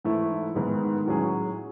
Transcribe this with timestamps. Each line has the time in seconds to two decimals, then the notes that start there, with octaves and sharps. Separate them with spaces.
0.04 G#2 E3 A3 E4
0.55 G#2 D#3 G#3 B3
1.06 A2 F#3 C#4 G#4